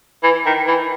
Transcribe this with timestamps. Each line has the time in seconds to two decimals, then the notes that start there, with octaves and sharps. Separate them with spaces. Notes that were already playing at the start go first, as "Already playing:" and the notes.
0.23 E3
0.46 D#3
0.67 E3